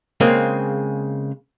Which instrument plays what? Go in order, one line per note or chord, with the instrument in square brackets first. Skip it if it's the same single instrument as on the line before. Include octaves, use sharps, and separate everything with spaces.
[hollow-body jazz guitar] C#3 G#3 A#3 C4